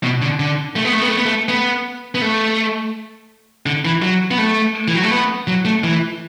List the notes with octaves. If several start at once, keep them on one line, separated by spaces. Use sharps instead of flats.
B2
D3
D3
A3
B3
A3
B3
A3
B3
A3
B3
B3
A3
D3
E3
F#3
B3
A3
E3
F#3
A3
B3
F#3
A3
E3